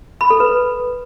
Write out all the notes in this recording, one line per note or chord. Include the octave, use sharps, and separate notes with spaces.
B5
A4
B4